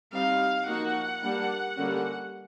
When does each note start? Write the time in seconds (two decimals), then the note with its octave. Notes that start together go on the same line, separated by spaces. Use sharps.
0.12 G3 C4 D#4 F5
0.67 F3 A#3 D#4 F#4 F#5
1.22 G3 A#3 D4
1.77 D3 G3 A#3 C#4 F#4